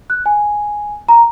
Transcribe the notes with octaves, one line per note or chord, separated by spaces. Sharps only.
F#6
G#5
A#5